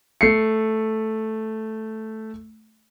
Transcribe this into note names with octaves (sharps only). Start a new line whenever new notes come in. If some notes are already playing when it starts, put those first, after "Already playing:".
A3 C7 C#7